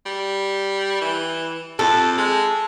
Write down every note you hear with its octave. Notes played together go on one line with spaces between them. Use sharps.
G3
E3
F2 A4
G#3